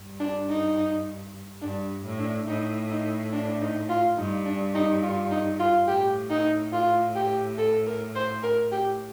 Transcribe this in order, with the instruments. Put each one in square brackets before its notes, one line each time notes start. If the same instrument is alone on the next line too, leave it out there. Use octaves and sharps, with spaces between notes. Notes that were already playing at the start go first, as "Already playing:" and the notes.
Already playing: [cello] G2
[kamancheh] D4
D#4
[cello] G2 [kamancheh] D4
[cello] A2
[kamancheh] D4
[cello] A2 [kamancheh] D#4
[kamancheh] D#4
D4
D#4
F4
[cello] G2 [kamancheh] D#4
[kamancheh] D4
D#4
F4
D#4
F4
[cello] A2 [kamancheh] G4
[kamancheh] D#4
F4
G4
A4
A#4
C5
A#4
G4